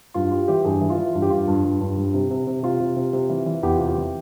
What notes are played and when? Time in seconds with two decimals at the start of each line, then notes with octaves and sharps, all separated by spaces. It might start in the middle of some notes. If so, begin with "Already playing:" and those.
0.14 G2 F4
0.32 G3 F4
0.48 E3 G4
0.64 G2 G#4
0.81 E3
0.90 F4
0.98 E3
1.14 G2 F4
1.22 G4
1.30 G2 F4
1.48 G2
1.64 G2
1.81 G2
1.97 G2
2.14 C3
2.31 C3
2.47 C3
2.63 C3 F4
2.80 C3
2.96 C3
3.13 C3
3.29 E3
3.46 E3
3.63 E2 G4
3.76 C3 F4
3.89 G4
3.96 E3